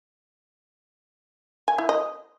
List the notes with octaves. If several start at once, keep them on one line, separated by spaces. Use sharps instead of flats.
G#5
E4
D#5